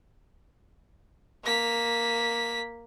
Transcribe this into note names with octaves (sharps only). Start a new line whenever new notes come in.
A#3 B6